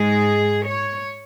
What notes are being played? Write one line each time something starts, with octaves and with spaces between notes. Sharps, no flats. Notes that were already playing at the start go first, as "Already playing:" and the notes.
Already playing: G#2 G#3 G#4
C#5